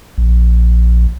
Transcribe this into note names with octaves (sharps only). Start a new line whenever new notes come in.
A#1